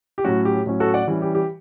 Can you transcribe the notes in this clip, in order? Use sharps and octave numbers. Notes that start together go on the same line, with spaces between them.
G4
A2 F#3 C#4 F#4
G4
A2 F#3 C#4
F#4 A4
D5 F#5
E3 G3 C#4
G4
G4